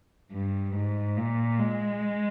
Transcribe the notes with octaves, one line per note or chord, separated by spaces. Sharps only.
G2
G#2
A#2
G#3